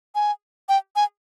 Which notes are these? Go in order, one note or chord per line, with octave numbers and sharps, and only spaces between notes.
G#5
G5
G#5